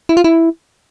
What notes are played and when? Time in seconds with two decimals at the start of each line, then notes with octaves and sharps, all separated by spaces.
0.09 E4
0.17 F4
0.24 E4